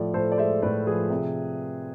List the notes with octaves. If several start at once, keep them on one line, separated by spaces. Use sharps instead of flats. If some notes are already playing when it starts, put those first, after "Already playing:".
Already playing: A2 F3 D5
A2 A4 C5
D5
G#3 C5 E5
A2 B4 D5
F3 G#4 B4
C3